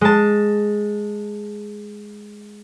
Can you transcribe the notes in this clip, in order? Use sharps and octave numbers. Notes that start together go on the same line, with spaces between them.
G#3 A5